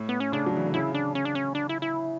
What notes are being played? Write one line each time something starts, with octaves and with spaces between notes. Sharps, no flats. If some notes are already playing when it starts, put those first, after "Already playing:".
Already playing: A2
B3
C#4
C#3 D4
F#3
E3
D3
C#3 E4
D4
C#4
D4
C#4
D4
E4
E4